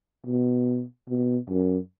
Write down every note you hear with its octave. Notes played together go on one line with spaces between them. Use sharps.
B2
B2
F#2